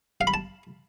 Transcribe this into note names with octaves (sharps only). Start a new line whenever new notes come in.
F5
B5
A5